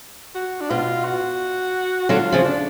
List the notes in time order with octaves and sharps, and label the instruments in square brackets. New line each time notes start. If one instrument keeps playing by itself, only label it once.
[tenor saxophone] F#4
D4
[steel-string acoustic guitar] B2 [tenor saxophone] F4
[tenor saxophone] F#4
[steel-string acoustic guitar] D3 F#3 [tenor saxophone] F4
[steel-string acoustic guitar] C#3 F3
[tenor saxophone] D4